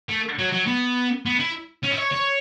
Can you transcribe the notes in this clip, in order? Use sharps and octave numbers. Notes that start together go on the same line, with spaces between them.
A3
F#3
F#3
B3
B3
E4
C#4
E5
C#5
C#5